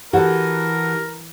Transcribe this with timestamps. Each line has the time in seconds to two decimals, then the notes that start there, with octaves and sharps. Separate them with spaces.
0.13 E3 F#4 G4 A4 A#4